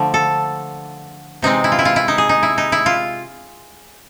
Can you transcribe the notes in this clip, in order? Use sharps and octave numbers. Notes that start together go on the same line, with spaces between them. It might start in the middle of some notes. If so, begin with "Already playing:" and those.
Already playing: D3 F3 A3
A4
C3 E3 G#3 C4 D#4
E4
F4
E4
F4
E4
D#4
G#4
D#4
E4
D#4
E4
F4